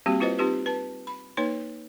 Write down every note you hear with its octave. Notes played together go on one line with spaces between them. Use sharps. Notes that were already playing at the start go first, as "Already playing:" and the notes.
G3 A#3 C4 F#4 G4
E4 F4 B4 C5 D#5
C4 D#4 F4 G4 B4
B4 A5
B5
A#3 D#4 B4 C#5